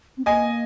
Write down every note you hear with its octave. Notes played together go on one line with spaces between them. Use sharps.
C4
A#3 D#5 G#5